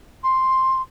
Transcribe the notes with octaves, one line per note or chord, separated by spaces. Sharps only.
C6